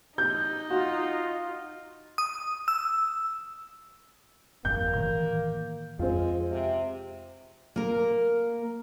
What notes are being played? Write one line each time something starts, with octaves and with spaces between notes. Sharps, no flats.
D#4 G6
F4 F#4
D#6
E6
G1 F2 A#3 G6
A2 D#3 E3
F2 G#3 C4 F4
C3
A#3 A#4